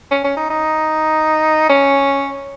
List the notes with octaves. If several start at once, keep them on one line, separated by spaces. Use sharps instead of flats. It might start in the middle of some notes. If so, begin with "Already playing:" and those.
C#4
C#4
D#4
D#4
C#4